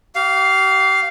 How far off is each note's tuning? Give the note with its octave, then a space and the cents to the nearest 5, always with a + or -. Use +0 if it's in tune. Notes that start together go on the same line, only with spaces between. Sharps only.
G4 -40 F5 +0